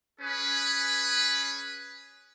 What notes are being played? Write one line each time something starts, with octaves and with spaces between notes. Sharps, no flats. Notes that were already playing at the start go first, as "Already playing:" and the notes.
C#4 G#4 B4